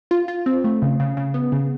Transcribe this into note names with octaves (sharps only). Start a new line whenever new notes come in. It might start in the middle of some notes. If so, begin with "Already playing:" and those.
F4
F4
C4
A3
C#3
C#3
C#3
B3
C#3